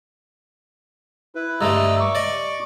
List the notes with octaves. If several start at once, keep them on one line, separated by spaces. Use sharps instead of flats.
E4 B4
G2 D3 A3 D#5 A#5 E6
C#6 D6
D5 D#5